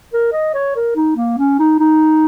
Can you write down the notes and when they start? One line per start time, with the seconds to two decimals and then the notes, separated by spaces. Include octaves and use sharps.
0.13 A#4
0.33 D#5
0.55 C#5
0.76 A#4
0.96 D#4
1.17 A#3
1.38 C#4
1.59 D#4
1.79 D#4